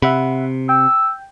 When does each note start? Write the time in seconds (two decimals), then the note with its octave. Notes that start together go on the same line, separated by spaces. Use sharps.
0.02 C3 E5 F#5 B5
0.69 G5 E6